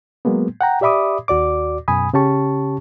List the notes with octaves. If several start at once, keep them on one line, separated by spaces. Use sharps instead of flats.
F#3 G#3 A#3 B3
F#5 G5 A#5
G4 D5 E5 B5 D6 D#6
D#2 F#4 D5 D6
F#2 B2 G#5 B5 D#6
C#3 C#4 G4 A5 C#6